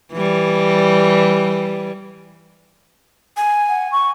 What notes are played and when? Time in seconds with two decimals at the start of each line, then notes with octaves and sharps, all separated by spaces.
0.13 E3 G3
3.37 G#5
3.69 F#5
3.92 C#6